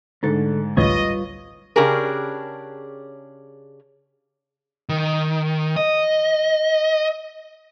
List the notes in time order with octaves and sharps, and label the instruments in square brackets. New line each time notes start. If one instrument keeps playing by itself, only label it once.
[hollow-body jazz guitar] D2 A4 [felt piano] G#2 D3
[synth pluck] A1 D2 [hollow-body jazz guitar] G2 F4 C#5 [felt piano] B4 [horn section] D#5
[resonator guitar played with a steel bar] C#3 C#4 D4 G4 G#4 A#4
[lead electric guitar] D#3
D#5